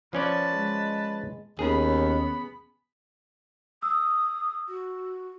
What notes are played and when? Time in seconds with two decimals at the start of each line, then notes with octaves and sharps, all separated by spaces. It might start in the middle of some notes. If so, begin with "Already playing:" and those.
0.13 F3 C#4 B4 D5 A5
0.52 G#3
1.59 D#2 B3 C#4 G#4 B5
3.82 D#6 E6
4.68 F#4